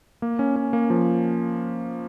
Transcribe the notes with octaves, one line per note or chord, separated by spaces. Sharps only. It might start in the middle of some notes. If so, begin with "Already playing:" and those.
A#3
C#4
C#4
A#3
F3